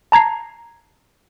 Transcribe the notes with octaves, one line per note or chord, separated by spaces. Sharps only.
A5 A#5 G#6 C7